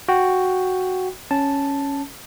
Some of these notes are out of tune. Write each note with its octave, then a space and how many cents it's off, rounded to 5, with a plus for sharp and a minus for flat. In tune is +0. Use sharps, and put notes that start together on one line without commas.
F#4 +0 G5 +0
C#4 +0 A5 -5